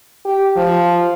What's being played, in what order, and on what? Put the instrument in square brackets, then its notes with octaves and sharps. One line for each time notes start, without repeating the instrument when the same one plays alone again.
[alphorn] G4
F3